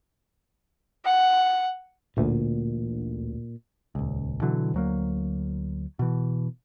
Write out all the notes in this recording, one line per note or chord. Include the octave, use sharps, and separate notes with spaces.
F#5
A1 D2 A#2
D#1 C#2
B2 D3 E3 F#3
D2 F#3 A#3
B2 E3